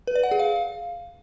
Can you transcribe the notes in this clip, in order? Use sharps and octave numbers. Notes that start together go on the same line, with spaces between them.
B4
D5
F#5
G#4
F5